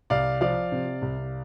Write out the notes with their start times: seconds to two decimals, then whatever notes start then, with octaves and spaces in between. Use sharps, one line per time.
0.10 C2 D5 F5
0.41 F3 D5 F5
0.72 C3
1.02 C2